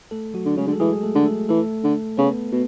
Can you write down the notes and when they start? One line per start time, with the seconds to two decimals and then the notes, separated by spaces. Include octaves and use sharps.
0.11 A3 A4
0.34 F#3 F#4
0.45 D3
0.57 C#3 G#3 G#4
0.67 D3
0.72 A4
0.80 E3 G#3 G#4
1.03 A3 A4
1.15 D3
1.26 A3 A4
1.49 E3 A3 A4
1.84 D3
2.17 C#3 B3 B4
2.52 B2